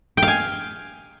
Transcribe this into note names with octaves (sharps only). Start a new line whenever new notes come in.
G5
F5
G#5